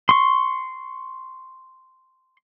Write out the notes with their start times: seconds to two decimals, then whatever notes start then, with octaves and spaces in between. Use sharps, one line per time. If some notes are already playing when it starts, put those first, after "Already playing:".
0.09 C6 C#6